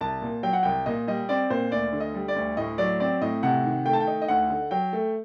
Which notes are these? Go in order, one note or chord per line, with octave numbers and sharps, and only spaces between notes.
C2 A5
A#2
F#3 G5
F#5
C2 G5
A#2 D#5
G3 D#5
C4 D5
A#2 C5
D2 D5
D3
D#5
G3
D5
D2
A2 D#5
F#3 D5
C4 D5
A2 D#5
C3 F#5
D#3
A3 G5
A5
G5
D#4
D#5
D2 F#5
D3
F#3 G5
A3